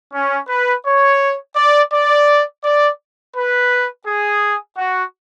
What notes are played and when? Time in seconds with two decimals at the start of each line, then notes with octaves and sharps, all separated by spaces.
0.14 C#4
0.49 B4
0.85 C#5
1.56 D5
1.93 D5
2.64 D5
3.35 B4
4.06 G#4
4.77 F#4